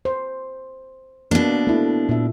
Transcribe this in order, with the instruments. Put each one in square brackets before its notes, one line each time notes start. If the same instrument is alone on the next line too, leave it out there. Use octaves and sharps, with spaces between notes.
[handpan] C5
[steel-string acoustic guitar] B2 D4 [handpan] A#3
[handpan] A3 E4
A#2 E5